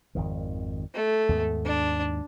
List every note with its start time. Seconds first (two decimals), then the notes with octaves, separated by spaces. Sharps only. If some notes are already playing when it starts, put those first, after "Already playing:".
0.15 G#1 F2 D#3
0.94 A3
1.29 D#2 G#2 B3
1.65 D4